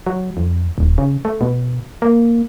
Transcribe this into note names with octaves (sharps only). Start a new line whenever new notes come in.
F#3
F2
D#1
C#3
A3
B2
A#3